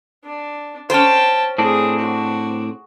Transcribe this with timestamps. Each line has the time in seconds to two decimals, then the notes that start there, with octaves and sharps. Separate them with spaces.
0.25 D4
0.90 C#4 C5 G5 A5
1.58 A2 A3 C4 D4 G#4
1.99 F#4